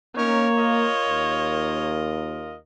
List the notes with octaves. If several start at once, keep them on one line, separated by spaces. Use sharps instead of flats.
A#3 C#4 D#4 A#4 C#5
F4 A#4 D#5
D#2